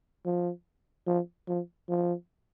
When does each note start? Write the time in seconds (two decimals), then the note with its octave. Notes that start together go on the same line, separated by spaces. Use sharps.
0.26 F3
1.07 F3
1.48 F3
1.89 F3